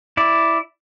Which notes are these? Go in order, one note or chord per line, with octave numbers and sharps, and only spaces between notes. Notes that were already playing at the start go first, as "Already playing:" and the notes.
E4 D5